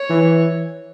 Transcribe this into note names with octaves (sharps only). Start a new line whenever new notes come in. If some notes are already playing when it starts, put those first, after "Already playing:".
Already playing: C#5
E3